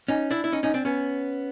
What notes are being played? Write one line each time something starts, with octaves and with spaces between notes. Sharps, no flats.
C#4 D#4
D4 E4
E4
C#4 D#4
C#4 D#4
C4 D4
B3 C#4